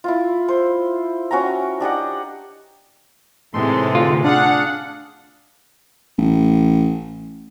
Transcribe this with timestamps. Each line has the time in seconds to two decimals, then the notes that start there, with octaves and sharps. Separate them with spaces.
0.04 E4 F4
0.48 C5
1.31 C#4 F#4 G5 A#5
1.80 D4 G4 D#5 F#5
3.54 A2 C3 E3 G#3 D#4 A4 C6
3.95 D3 F4
4.24 D4 G#4 D5 F5 F#5
6.18 A1